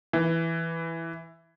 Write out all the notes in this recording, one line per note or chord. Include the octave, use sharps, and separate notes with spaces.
E3